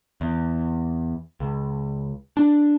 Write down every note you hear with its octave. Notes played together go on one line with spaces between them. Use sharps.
E2
C#2
D4